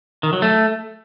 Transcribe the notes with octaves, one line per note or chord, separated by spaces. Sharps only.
D#3
F#3
A3